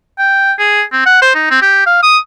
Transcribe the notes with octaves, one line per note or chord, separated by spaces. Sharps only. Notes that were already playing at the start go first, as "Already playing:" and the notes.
G5
G#4
C4
F#5
C5
D#4
C4
G4
F5
D#6